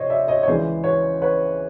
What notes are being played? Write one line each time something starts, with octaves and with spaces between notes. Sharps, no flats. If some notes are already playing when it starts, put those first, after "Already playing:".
Already playing: C3 C5 C#5 D#5
D5 E5
C#5 D#5
C#5
C#2 C#3 E3 C5 D5
B4 C#5
B4 C#5